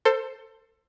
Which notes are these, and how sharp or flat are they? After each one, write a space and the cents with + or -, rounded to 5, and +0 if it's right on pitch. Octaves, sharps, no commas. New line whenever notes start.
A4 +25 C5 +5